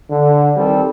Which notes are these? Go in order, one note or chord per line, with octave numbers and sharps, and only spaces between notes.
D3
D#3 G3 C4 A4